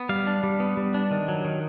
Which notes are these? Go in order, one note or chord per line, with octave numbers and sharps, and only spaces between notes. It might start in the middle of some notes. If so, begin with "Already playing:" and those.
Already playing: B3
G3 F5
D4
G3
B3
G3
D4
D#3
F#3
D#3